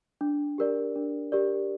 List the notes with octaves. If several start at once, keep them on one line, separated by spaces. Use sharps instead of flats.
D4
G4 A#4 D5
D4
G4 A#4 D5